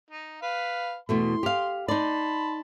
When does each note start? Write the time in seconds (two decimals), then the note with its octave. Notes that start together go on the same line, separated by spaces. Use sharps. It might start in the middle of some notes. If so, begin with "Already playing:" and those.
0.11 D#4
0.42 B4 F5
1.09 E2 B2 A3 C6
1.43 G4 F5
1.88 D#4 D5 A5 B5 C6